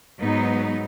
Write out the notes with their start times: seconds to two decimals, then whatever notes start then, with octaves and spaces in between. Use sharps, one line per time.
0.20 G#2 F#3 B3 D#4